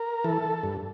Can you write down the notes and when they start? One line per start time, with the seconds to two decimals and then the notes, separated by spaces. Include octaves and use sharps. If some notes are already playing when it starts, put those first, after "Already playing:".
Already playing: A#4
0.24 E3 A4
0.63 G2